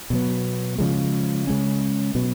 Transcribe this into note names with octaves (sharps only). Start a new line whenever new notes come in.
B2 F#3 B3
C#3 F3 G#3
C#3 G#3 C#4
B2 F#3 B3